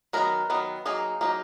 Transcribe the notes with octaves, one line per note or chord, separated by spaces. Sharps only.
D#3 F#3 B3 A#4
D#3 F#3 B3
F#3 A#3 D#4 G#4
F#3 A#3 D#4